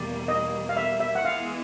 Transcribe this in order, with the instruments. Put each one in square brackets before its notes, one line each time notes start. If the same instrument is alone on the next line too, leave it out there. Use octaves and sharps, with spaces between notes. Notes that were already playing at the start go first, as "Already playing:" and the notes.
Already playing: [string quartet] E2 B2 G3 A#3 [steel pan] D5
[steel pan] D#5
F5
E5
E5
F#5
[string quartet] E3 G#3 B3 [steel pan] F5